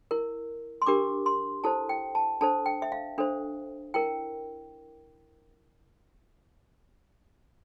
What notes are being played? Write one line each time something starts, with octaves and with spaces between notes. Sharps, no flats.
E4 A#4
C6
D4 G4 A#4 D6
C6
E4 A4 C5 A5
G5
A5
D4 A4 C5 A5
G5
E5
F5
D4 A4 C5
E4 A#4 G5